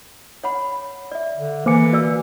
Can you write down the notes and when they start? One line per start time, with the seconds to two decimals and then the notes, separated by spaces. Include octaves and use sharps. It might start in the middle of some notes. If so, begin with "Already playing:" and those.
0.44 C#5 F#5 B5
1.12 D5 E5
1.36 D3
1.66 E3 A#3 C5 G#5 D6 C#7
1.92 F#4 D5 E6